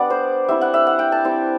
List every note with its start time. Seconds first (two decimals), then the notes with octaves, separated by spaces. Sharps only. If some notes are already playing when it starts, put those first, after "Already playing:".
Already playing: G3 B3 D4 D5 F#5
0.10 C5
0.48 G3 C4 E4 E5
0.61 F#5
0.74 E5
0.87 F#5
0.99 G5
1.12 A5
1.24 G3 C4 E4